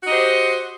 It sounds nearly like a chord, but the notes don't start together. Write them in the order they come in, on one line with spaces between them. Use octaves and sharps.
F#4 D#5 G4 C5